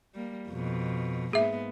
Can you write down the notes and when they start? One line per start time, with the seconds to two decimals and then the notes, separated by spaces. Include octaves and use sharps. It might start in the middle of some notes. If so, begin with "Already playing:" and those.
0.14 G3 A#3
0.49 F2 B2
1.33 G#2 A#3 B3 G#4 E5